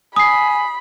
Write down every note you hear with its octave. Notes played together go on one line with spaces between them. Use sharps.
G#5 B5 D#6 C7